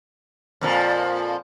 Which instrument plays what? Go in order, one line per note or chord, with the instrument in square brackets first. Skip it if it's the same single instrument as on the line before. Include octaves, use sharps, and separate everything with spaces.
[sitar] F2 A#2 F3